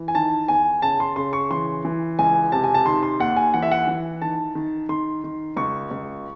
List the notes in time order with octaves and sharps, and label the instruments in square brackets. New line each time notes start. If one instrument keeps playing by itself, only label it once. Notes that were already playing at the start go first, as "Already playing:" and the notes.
Already playing: [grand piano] E3
G#5
D#3 A5
E2 G#5
C#3 A5
C6
C#3 C6
C#6
E3 C6
E3
C#2 G#5
C3 A5
G#5
A5
D#3 C6
C6
D#2 F#5
G#5
E3 F#5
E5
F#5
E3
D#3 A5
D#3
D#3 C6
D#3
C#2 C#6
C#2